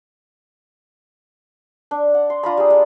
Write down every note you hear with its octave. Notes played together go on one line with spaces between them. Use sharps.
D4
F#5
C6
D4 F4 A#5 B5
G3 G#4
G#3